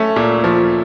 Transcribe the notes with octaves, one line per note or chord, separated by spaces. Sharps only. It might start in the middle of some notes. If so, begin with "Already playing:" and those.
Already playing: A3 C#4
A#2
F3